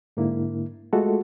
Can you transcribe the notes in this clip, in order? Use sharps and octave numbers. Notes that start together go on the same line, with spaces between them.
G#2 D3 A#3 E4
G#3 A3 F4 F#4 A4